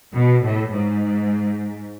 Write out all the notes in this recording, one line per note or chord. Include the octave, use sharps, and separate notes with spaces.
B2
A2
G#2